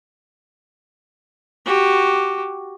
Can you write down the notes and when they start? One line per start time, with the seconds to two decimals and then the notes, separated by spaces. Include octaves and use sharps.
1.65 F#4 G4